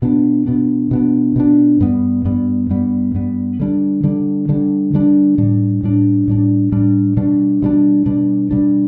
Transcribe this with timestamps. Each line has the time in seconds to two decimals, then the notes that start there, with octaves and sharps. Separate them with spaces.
0.02 B2 B3 D4
0.46 B2 B3 D4
0.91 B2 B3 D4
1.36 B2 B3 D4
1.80 G2 G3 B3
2.25 G2 G3 B3
2.70 G2 G3 B3
3.15 G2 G3 B3
3.59 D3 G3 D4
4.03 D3 G3 D4
4.49 D3 G3 D4
4.93 D3 G3 D4
5.38 A2 G3 D4
5.83 A2 G3 D4
6.28 A2 G3 D4
6.72 A2 G3 D4
7.17 B2 G3 D4
7.62 B2 G3 D4
8.06 B2 G3 D4
8.51 B2 G3 D4